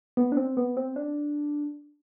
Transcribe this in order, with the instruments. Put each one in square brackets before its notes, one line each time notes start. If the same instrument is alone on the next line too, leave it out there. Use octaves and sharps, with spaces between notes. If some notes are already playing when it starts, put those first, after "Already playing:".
[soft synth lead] B3
D4
C4
B3
C4
D4